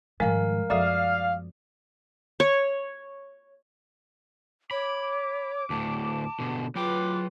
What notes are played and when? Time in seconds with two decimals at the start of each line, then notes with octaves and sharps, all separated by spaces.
0.20 G#2 D#3 F3 G3 G#3 A#4 F5
0.70 F#2 F3 B3 A4 D5 E5 F5 D#6
2.40 C#5
4.71 C#5 B5 D6
5.70 D2 A2 A5
6.40 B2 D3
6.75 F#3 F4 B4 G5 D6